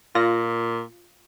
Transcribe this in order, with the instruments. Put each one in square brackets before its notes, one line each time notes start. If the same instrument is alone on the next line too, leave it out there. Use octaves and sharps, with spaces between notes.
[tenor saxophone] A#2 [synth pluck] F4 A#6